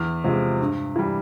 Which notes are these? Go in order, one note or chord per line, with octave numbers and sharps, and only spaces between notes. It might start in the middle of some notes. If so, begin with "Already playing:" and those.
Already playing: E2 F6
C3 F3 G#3
G2
E3 G3